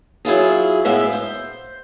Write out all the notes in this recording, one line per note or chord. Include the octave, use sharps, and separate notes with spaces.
F#3 E4 F4 G#4
A2 G#3 B3 E5 F5
C5